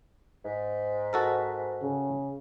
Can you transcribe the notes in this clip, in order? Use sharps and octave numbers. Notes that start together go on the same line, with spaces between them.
G#2
F#4 A4 A#4
C#3